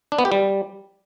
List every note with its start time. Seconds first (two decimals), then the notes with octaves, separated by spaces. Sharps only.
0.12 D4
0.18 B3
0.25 G4
0.32 G3